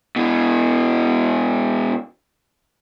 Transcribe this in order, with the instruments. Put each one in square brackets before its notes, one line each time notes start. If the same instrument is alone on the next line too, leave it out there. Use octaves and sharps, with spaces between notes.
[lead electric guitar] B2 E3